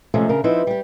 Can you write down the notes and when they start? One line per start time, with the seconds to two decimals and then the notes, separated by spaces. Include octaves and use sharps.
0.14 C3 F3 G#3 A3 C#4
0.29 C#3 D4 A#4
0.44 F3 C4 D#4 E4 B4
0.67 G3 G4